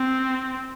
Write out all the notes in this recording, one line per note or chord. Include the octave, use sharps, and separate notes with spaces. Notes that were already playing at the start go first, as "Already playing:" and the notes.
Already playing: C4